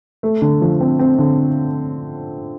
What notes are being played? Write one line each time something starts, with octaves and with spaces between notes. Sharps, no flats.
A3
D3
F3
C4
C4
D3